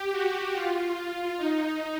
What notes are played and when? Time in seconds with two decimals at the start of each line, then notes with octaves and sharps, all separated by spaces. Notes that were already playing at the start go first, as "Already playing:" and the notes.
Already playing: G4
0.11 F#4
0.54 F4
1.37 D#4